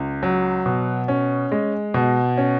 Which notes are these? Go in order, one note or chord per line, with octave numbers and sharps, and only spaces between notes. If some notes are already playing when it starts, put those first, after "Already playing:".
Already playing: C#2
F#3
B2
C#4
G#3
B2
C#4